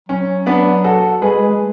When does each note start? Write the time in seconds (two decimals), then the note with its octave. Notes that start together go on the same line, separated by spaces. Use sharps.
0.09 F#3 C#4
0.46 B3 D4
0.84 F#4 A4
1.22 G#3 G#4 B4
1.51 G#3